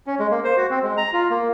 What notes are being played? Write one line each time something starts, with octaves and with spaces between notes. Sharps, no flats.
C#4
G#3
A#3
C5
F#4
C4
G#3
A#5
F4
A#3